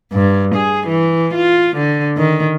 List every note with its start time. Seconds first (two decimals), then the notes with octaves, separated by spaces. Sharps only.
0.13 G2
0.55 G#4
0.88 E3
1.35 F4
1.76 D3
2.17 D#3